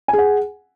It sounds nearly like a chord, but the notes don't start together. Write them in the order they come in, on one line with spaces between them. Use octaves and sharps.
G#5 G#4 F#5